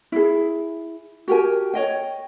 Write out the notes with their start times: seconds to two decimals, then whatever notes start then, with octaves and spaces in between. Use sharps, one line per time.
0.12 E4 G#4
1.28 F#4 G4 A#4 G#5
1.74 C#5 D#5 G5